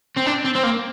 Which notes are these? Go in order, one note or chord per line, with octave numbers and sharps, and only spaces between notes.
C4
D4
C4
C4
A#3